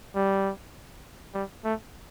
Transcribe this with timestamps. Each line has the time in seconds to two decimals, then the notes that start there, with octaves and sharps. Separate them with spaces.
0.15 G3
1.34 G3
1.64 A3